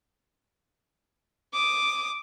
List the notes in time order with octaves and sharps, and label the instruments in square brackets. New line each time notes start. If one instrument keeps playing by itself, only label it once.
[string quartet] D6 D#6